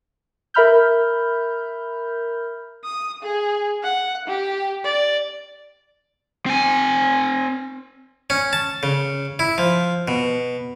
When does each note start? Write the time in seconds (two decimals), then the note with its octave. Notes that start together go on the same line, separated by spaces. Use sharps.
0.54 A#4 E5 B5 F6 G6
2.84 D#6
3.23 G#4
3.83 F#5
4.27 G4
4.84 D5
6.46 C4 G#5
8.30 C#4
8.53 A5
8.83 C#3
9.39 E4
9.58 F3
10.08 B2